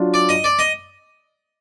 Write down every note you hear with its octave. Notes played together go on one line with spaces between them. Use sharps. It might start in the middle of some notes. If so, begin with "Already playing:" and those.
Already playing: F#3 D4 F4
D5
D#5
D5
D#5